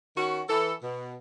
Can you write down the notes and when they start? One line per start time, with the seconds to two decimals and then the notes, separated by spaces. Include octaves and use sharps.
0.17 D#3 C#4 F#4
0.49 E3 A4
0.82 B2